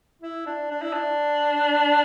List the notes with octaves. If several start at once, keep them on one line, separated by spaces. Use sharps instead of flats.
E4
D4
D4
E4
D4